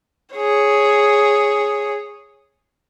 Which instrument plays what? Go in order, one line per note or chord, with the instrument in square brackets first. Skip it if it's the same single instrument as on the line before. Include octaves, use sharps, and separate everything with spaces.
[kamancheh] G#4 C#5